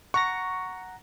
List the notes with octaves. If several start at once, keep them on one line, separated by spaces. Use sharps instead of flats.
F#5 A#5 C#6 A#6